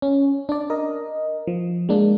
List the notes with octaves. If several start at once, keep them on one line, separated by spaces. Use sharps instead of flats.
C#4
D4 D5
A#4 D#5
F3
G#3 A#3 D4